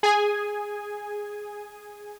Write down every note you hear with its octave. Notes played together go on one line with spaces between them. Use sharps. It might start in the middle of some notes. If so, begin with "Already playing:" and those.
G#4 G#5